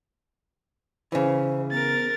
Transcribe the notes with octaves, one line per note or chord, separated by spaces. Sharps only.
C#3 E3 C5
B3 A#4 A6